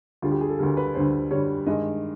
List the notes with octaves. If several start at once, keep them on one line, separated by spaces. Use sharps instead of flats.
D2 D3 G3 F4
G4
G#4
A4
D2 D3 G3 A#4
B4
D2 D3 G3 C5
D2 D3 G3 C#5
G2 D#3 G#3 D#5